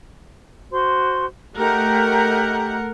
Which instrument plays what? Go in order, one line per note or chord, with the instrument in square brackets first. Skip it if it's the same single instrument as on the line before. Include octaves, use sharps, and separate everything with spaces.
[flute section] F#4 C5 C6
[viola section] A3 A#4 F#5 [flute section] D#4 G4